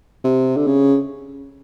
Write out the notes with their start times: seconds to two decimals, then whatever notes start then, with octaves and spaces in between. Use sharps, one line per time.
0.24 C3
0.57 D3
0.67 C#3